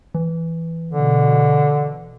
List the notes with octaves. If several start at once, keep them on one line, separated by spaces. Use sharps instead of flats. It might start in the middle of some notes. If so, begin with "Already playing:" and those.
E3
B2 D3